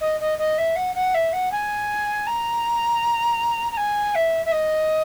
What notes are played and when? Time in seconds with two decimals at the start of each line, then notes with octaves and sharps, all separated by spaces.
0.01 D#5
0.20 D#5
0.38 D#5
0.58 E5
0.75 F#5
0.95 F#5
1.14 E5
1.32 F#5
1.51 G#5
2.27 A#5
3.71 A#5
3.77 G#5
4.15 E5
4.45 E5
4.51 D#5